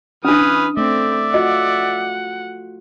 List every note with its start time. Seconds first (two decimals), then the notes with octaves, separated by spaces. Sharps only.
0.25 E3 C#4 D4 B4 D#6 F6
0.77 A3 C4 D5 E5
1.34 F4 F#4 D#5 F#5